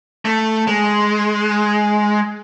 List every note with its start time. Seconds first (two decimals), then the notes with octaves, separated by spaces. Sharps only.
0.25 A3
0.67 G#3